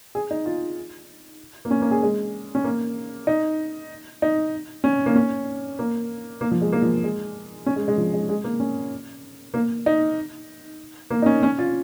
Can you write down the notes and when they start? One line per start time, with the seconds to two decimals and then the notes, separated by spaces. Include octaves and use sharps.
0.15 G#4
0.31 D#4
0.46 F4
1.65 A#3
1.71 C#4
1.82 A#3
1.91 G#4
2.03 G#3
2.55 C#4
2.64 A#3
3.27 D#4
4.22 D#4
4.84 C#4
5.06 A#3
5.16 C#4
5.79 A#3
6.41 A#3
6.51 F3
6.62 G#3
6.72 A#3
6.82 F3
7.04 G#3
7.66 C#4
7.76 G#3
7.88 G#3
7.98 F3
8.14 G#3
8.29 G#3
8.44 A#3
8.60 C#4
9.54 A#3
9.86 D#4
11.11 A#3
11.22 D#4
11.26 C#4
11.43 C#4
11.59 F4